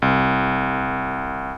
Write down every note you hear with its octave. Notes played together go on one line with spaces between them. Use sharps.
C2